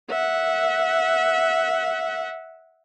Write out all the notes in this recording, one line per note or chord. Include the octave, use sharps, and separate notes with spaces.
E5 F#5